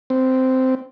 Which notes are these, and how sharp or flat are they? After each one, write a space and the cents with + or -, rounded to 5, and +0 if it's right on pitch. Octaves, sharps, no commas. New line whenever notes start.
C4 -10